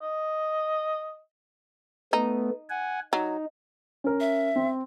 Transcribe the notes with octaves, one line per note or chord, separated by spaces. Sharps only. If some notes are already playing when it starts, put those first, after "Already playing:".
D#5
A3 B3 D#4
F#5 G#5
F#3 D#4
C#4 A#4
E5
C4